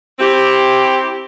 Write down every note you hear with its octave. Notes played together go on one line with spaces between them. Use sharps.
C4 E4 G4